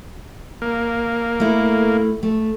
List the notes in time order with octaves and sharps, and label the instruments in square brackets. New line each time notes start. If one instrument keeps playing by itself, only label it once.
[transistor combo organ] A#3
[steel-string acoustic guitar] A3 E4
A3